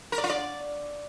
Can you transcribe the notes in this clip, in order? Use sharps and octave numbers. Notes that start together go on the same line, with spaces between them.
A#4
D5
F4
D5